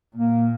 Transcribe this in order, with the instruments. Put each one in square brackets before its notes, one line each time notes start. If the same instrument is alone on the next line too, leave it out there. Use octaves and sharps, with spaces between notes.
[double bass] A#2 [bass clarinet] A#3